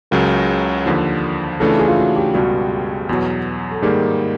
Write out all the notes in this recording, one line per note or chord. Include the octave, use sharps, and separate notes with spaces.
C#2 C#3 F#3 A#4
D#2 D3 F3
C#3 E3 A3 D4 F4 A4
G#4
F4
F#4
G4
C#2 B2 G3 F#4
E2 B2 F#3
A4
G#2 D#3 G3 A#3 G#4